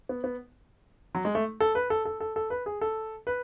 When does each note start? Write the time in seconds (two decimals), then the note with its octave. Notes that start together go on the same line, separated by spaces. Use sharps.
0.09 B3
0.24 B3
1.15 F#3
1.25 G#3
1.35 A3
1.60 A4
1.75 B4
1.90 A4
2.05 A4
2.20 A4
2.36 A4
2.50 B4
2.66 G#4
2.81 A4
3.27 B4